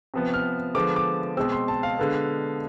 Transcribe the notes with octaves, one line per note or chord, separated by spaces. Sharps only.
C3 F3 B3
F6
D3 F3 G#3 B3 D6
D6
B2 G#3 C4 E6
C6
A5
F5
D3 G#3 B3